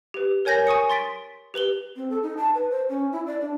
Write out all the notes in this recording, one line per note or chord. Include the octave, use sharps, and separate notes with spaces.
G4 B4
A#4 C#5 G#5 G6 A#6
G#5 C#6 D#6 C#7
C6 A6 B6 D7
G4 B4 F#7 G7
C4
A4
D#4
A5
B4
C5
C#4
E4
D5
D4